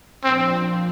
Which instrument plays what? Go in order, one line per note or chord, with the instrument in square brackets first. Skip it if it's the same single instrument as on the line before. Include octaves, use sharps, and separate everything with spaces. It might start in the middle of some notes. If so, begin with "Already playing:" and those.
[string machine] A#2 F3 D4 [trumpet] C4